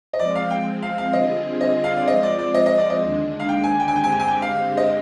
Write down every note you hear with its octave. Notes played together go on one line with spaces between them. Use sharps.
D#5
F3 G#3 C4 D5
F5
G5
F5
F5
D3 G3 C4 F4 G#4 D#5
D#5
F5
D5
F3 G#3 C4 F4 D#5
D5
D5
D#5
D#5
D5
D#5
D#2 D3 G#3 D4
F5
G5
G#5
G5
G#5
G2 D3 G#3 C4 G4 G5
G#5
G5
G#5
G5
F5
D#5